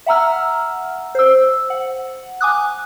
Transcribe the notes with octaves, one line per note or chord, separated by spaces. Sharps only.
E5 F#5 A#5 E6 F6
C5 E6
F#5
G#5 D6 D#6 F#6